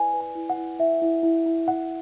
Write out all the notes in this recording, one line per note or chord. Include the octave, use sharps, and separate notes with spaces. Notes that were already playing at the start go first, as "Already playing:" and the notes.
Already playing: E4 B4 D5 G#5
B4
G#5
E4
F#5
E4
E4 E5
E4
E4
E4
E4 F#5